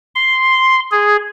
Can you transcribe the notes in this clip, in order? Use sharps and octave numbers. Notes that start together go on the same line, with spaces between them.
C6
G#4